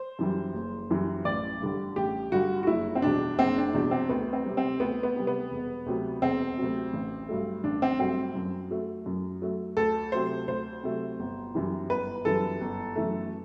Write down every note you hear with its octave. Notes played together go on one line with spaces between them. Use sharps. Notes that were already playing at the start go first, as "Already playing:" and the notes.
Already playing: C5
F#2 E3 G3
F#1
F#2 E3 G3
A1 D5
G2 D3 G3
A1 G4
G2 D3 G3 F#4
F#4
F#1 E4
C4
E2 B2 G3 D4
F#1 C4
D4
E2 B2 G3 D4
C4
D2 B3
C4
C3 G3
C4
D2 B3
B3
C3 G3
B3
E1
D2 C3 F#3
E1 C4
D2 C3 F#3
A1
G2 F#3 A3
A1 D4
C4
G2 F#3 A3 C4
F#2
F#3 A3
F#2
F#3 A3
D2 A4
C3 F#3 A3 C5
D2 C5
C3 F#3 A3
G1
F#2 E3 G3
G1 B4
F#2 E3 G3 A4
G1
F#2 E3 A3